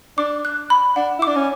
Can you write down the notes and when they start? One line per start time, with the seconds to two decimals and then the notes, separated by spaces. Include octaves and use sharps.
0.18 D4 D6
0.45 F#6
0.70 B5
0.96 D4 F#5
1.19 E4
1.22 D4 D6
1.36 C#4